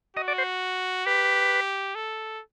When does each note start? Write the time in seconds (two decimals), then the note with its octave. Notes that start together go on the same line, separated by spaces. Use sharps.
0.16 F#4 D#5
0.28 D5
0.38 C5
1.05 G4 B4
1.95 A4